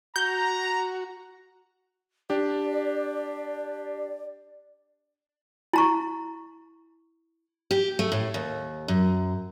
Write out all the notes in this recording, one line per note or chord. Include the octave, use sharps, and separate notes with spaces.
F#4 A#5 G6
D4 G4 D5
E4 A#5 C#6
G4
A3
A2
D#2
F#2